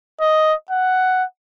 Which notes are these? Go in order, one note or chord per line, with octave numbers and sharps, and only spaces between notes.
D#5
F#5